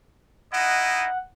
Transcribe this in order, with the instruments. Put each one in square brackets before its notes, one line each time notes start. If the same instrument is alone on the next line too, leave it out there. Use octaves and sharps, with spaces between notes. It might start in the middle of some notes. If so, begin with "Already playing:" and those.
[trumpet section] D#4 E4 D#5 [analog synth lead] F#5